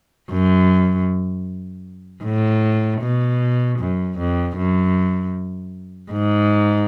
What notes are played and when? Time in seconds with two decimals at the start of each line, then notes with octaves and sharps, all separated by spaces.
0.30 F#2
2.24 A2
3.01 B2
3.79 F#2
4.18 F2
4.57 F#2
6.12 G#2